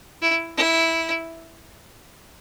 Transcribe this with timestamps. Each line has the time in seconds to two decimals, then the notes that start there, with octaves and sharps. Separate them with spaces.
0.22 E4
0.57 E4